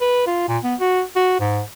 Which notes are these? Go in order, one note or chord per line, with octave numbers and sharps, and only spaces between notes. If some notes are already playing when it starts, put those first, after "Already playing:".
B4
F4
A#2
B3
F#4
F#4
G#2